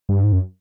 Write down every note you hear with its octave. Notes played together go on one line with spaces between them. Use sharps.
G2
G#2
F#2